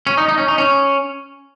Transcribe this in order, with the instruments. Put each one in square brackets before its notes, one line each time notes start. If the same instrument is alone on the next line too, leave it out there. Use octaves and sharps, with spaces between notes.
[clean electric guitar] C#4
D#4
D#4
C#4
D#4
C#4